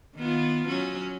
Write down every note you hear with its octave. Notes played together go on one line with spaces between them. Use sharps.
D#3 B3 F4
F#3 C#4